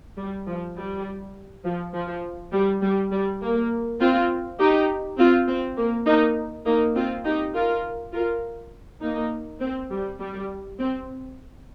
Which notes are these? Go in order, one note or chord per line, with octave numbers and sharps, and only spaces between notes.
G3
F3
G3
F3
F3
G3
G3
G3
A#3
C4 F4
D#4 G4
C4 F4
C4
A#3
A#3 D#4
A#3 D#4
C4 F4
D#4 G4
F4 A#4
F4 A#4
A#3 D#4
C4
G3
G3
C4